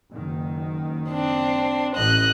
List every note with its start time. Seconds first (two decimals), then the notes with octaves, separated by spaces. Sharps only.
0.11 F#1 D#3
1.10 C4 D4
1.96 A1 A2 D#5 F#6